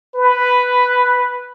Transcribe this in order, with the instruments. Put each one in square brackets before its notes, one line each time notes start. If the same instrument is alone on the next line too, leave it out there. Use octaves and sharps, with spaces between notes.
[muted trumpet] B4